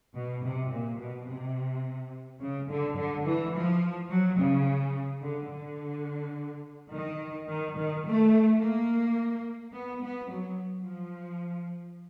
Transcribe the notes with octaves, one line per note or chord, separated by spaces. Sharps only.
B2
C3
A#2
B2
C3
C#3
D3
D3
E3
F3
F#3
C#3
D3
D3
D#3
D#3
D#3
A3
A#3
B3
B3
F#3
F3